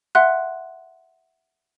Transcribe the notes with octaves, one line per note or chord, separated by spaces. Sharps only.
E5 F#5 C6 F#6